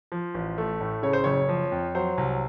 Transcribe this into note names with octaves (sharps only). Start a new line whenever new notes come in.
F3
A1
A3
A2
C#3 C#5
C5
F#1 C#5
F3
F2
F#3 C5
C2